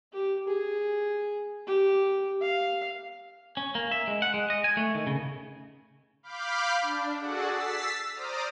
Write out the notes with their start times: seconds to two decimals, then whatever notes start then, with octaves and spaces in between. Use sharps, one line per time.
0.13 G4
0.47 G#4
1.67 G4
2.42 F5
3.57 C#4
3.75 A#3
3.91 E5
4.08 G#3
4.22 F#5
4.34 G#3
4.50 D#5
4.64 G#5
4.77 A3
4.95 D#3
5.07 C#3
6.23 F5 B5 D6 F6 G6
6.82 D4
7.17 F#4 G#4 A4 D5 F#5
7.48 E6 A6 B6 C7
8.12 C5 D5 A#5 D6 D#6 F6